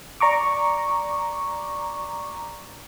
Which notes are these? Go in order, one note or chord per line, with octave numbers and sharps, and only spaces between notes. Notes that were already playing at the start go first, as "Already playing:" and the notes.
D5 A#5 C#6 D6